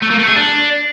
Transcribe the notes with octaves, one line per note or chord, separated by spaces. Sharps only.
A3
A#3
A3
G#4
D4